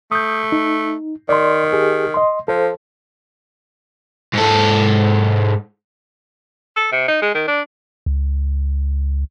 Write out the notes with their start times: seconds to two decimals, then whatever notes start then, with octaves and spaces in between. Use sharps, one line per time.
0.12 A3 D#6 G6
0.52 D#4
1.29 D#3 D5 C6
1.73 G4 G#4
2.14 D#5 C6
2.48 F3 A4 C5
4.34 G#2 A4
6.77 A4
6.92 C3
7.08 D#4
7.22 G#3
7.35 D#3
7.48 D4
8.06 C#2